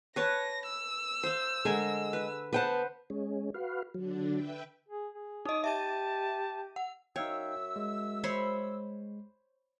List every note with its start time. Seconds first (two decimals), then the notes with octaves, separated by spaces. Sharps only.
0.16 B4 C#5 A5 A#6
0.66 E6
1.23 C5 F5
1.65 D3 G#3 A#4 G#5
2.13 B4
2.53 B3 B4 C5 F#5 G5 A5
3.10 G#3 C#4
3.54 F#4 B4 F5
3.94 D3 F#3 D4
4.33 B4 E5 G5
4.89 G#4
5.13 G#4
5.45 D#4 D#5 D#6
5.64 G4 E5 A5 A6 D#7
6.76 F#5
7.16 F#2 D#4 C#5 E5 F5 G5 E6
7.76 G#3
8.24 C5 C#5 B5